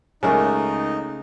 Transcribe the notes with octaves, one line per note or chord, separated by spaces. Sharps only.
C#2 C#3 A3 D#4 A#4